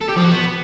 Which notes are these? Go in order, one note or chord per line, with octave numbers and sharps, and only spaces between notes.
A4
G4
F3
F#4
B3